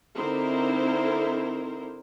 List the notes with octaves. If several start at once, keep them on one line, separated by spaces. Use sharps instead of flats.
D3 C4 D#4 E4 A#4 C5